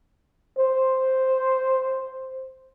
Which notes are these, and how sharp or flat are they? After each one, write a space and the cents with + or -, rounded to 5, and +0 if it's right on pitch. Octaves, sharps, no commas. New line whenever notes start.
C5 +0